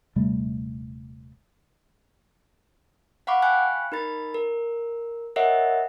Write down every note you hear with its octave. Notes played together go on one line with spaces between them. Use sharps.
D#1 C3 G3 A3
F5 F#5 B5 C#6 D6
F5 G5 G#5 B5 C#6 F#6
D#4 A#4 B5 A6
A#4
A#4 C#5 D#5 E5 F#5